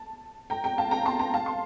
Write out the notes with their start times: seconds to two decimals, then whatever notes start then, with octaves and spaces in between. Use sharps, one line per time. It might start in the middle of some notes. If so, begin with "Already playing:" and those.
Already playing: A5
0.50 G5 A#5
0.64 G5 A#5
0.78 F5 A5
0.91 G5 A#5
1.06 A5 C6
1.19 G5 A#5
1.34 F5 A5
1.46 C6